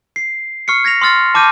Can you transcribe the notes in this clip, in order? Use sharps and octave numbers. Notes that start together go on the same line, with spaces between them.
C7
C#6 F6 C7 C#7
G#6 A#6 B6 F7
C6 D#6 F6 A6 C7
A5 D6 F6 G6 D#7